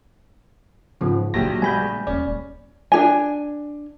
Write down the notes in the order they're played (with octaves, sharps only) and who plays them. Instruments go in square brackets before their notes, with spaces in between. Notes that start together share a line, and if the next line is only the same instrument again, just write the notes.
[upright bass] G#2 [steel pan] C#3 F3 B3
[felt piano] A#1 F#3 G4 [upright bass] D#3 A#3 [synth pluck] A#6
[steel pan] G3 G#3 B3 [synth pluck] G#5 B5 G6
[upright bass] D#1 [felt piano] C#4 [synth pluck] D5
[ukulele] D4 G#4 G#5